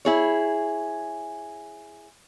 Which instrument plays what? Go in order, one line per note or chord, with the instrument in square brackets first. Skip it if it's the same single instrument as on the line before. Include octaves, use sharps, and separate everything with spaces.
[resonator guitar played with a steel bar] E4 G#4 C#5